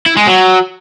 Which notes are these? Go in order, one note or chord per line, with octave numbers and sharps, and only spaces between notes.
E4
G#3
F#3